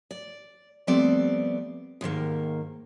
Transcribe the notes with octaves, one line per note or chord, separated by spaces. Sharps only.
D5
F3 G3 A3 B3 C4 D5
D#2 G#2 D#3 A#3